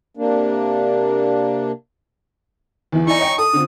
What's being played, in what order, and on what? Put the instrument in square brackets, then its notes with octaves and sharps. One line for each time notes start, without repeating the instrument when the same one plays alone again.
[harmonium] C3 A#3 D4
[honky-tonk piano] E2 E3
[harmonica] D#4 C#6 [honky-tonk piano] E4 D5 G#5
[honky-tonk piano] C#5 D#5 G5
[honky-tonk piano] A4 [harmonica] D#6
[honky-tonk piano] D3 C4 F4